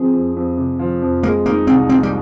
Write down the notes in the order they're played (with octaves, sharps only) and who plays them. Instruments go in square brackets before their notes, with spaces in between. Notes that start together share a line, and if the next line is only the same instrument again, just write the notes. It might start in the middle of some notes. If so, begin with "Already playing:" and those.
Already playing: [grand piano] F3 G#4 [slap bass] C4
[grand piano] F2
F2
C3
F3
F2
[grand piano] G#3 [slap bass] A#3
[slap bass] A#3 [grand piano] D#4
[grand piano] C2 [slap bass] C4
[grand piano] A#2 [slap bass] C4
[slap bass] G3